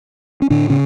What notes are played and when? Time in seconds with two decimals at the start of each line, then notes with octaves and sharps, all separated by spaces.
0.42 C#4
0.50 A2 D3 D4
0.70 C#3 C#4